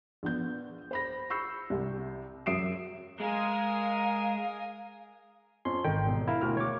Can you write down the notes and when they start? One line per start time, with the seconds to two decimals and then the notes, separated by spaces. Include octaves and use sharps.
0.23 A#1 B3 G6
0.91 C5 B5 A#6
1.30 B5 C#6 E6 G6 C7
1.70 C2 C3
2.46 F#2 E5 D#6 C7 D7 E7
3.20 G#3 A#4 F5 G#5 D#6
5.65 F2 C#4 C6
5.84 G#1 D#3 G5
6.05 E1
6.28 E4 A#4 F5
6.41 E1 D2 F6
6.57 C#5 D6